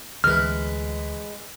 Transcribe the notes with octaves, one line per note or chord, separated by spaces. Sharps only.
D2 E3 G#3 B4 F6